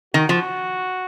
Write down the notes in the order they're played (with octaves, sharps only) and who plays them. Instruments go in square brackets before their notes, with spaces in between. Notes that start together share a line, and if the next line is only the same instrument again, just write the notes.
[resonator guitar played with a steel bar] D#3 [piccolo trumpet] F#4
[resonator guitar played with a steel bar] F3